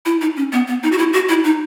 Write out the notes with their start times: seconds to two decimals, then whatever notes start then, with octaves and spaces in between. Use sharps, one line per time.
0.06 E4
0.21 D#4
0.36 C#4
0.52 B3
0.68 B3
0.83 D#4
0.92 F#4
0.98 E4
1.13 F#4
1.29 E4
1.44 D#4